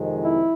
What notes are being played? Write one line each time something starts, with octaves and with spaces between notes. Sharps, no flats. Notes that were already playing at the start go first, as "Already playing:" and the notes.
Already playing: F2 C3 D#3 G#3
E4